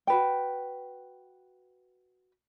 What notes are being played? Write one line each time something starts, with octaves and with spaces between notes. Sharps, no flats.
F#4 B4 G5